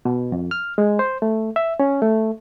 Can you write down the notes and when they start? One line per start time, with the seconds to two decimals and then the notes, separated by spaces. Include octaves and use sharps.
0.05 B2
0.32 F2
0.51 F6
0.78 G#3
0.99 C5
1.22 A3
1.56 E5
1.80 C#4
2.02 A3